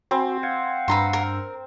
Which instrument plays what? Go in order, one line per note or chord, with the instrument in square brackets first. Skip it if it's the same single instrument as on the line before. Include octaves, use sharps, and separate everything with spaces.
[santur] C4 [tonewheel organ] F#4 [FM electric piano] G#5 B5
[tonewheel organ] F5 F#5 [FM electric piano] G#6
[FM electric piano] G2 D4 E6 [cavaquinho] B4 A#5 C6
[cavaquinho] A#4